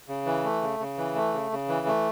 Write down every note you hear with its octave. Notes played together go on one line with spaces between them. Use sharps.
C#3
E3
A3
C#3
C#3
E3
A3
C#3
C#3
E3
A3